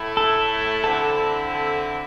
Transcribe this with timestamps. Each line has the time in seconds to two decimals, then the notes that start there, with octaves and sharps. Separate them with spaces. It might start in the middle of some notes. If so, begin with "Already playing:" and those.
Already playing: A2 A3 E4
0.17 A4
0.84 D3 C4 E4 A4